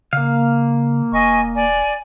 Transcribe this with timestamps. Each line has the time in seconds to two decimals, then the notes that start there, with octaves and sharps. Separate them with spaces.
0.13 C#3 A#3 F5
1.12 E1 D#5 G#5 C#6
1.55 D5 G#5